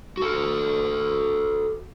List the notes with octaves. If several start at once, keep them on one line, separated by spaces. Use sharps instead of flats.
F#4 A4